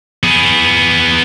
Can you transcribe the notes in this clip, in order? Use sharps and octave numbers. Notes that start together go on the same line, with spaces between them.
B3 G#4